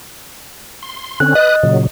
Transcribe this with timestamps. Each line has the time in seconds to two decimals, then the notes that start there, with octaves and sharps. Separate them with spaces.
0.82 C6
1.20 D3 C4 C#4 F#6
1.35 B4 D#5 D#6 F#6
1.63 A#2 C#3 F#3